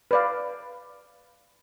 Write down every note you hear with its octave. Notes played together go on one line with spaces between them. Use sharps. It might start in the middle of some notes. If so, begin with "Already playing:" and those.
B4 D5 F5